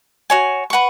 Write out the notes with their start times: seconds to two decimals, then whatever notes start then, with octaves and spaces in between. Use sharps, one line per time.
0.30 F#4 C#5 G#5
0.70 B4 F#5 C#6